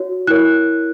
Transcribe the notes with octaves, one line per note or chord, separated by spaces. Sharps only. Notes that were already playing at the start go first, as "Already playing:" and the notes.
Already playing: F#4 C#5
E4 A#4 C#5 F#6